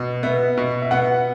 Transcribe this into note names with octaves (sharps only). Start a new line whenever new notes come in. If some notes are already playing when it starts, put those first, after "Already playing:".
Already playing: B2
B3 E5
B2
E5
B3 F#5